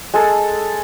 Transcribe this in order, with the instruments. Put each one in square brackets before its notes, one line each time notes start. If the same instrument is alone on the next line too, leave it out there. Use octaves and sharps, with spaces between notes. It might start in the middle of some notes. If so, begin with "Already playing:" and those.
[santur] G#3 A4